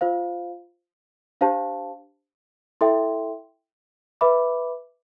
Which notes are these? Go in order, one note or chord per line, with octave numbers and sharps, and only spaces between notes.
F4 C5 F5
D4 G4 C5 F5 A5
E4 A4 E5 G5 C6
B4 E5 B5 D6